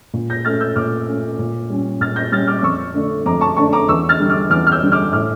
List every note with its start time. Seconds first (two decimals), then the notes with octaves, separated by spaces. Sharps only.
0.14 A#2
0.30 G6 A#6
0.45 A3 C#4 F6 A6
0.60 E6 G6
0.76 A#2 D6 F6
1.07 A3 C#4
1.39 A#2
1.70 G3 C#4
2.01 A#2 F6 A6
2.16 G6 A#6
2.32 G3 C#4 F6 A6
2.47 D6 F6
2.59 D6
2.63 F2 C#6 E6
2.94 D3 A3 D4
3.26 F2 A#5 D6
3.41 A5 C#6
3.57 D3 A3 D4 A5 C#6
3.73 A#5 D6
3.88 E2 C#6 E6
4.09 F6 A6
4.20 D3 G3
4.30 D6 F6
4.50 E2 D6 F6
4.67 F6
4.72 E6 G6
4.82 D3 G3
4.92 D6 F6
5.13 A2 D6 F6